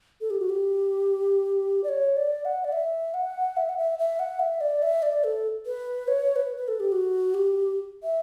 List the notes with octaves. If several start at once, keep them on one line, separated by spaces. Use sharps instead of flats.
A4
G4
F#4
G4
D5
C#5
D5
F#5
D5
E5
F#5
E5
F#5
E5
E5
F#5
E5
D5
E5
D5
A4
B4
C#5
B4
B4
A4
G4
F#4
G4
E5